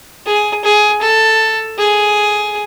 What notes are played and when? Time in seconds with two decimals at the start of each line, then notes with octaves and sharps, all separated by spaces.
0.26 G#4
0.64 G#4
1.02 A4
1.78 G#4